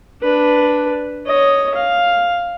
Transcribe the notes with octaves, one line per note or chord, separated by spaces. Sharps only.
D4 B4
C#5 D#5
F5